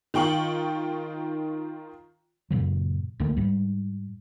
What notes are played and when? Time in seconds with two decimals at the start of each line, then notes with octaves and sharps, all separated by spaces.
0.14 D#3 F4 G5 C#6 F#7
2.51 F#2 A#2 C#3 F#3
3.20 C#2 D3 A3 A#3
3.37 G#2 G3